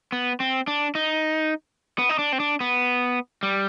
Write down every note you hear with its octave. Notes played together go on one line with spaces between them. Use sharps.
B3
C4
D4
D#4
B3
D#4
D4
C4
D4
B3
G3